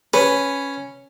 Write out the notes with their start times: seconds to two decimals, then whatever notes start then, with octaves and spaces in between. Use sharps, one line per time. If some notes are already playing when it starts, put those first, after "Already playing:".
0.14 C#4 B4